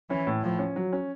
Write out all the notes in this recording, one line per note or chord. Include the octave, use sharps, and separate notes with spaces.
E3 C#4
A2
A2 F3
C#4
F#3
C#4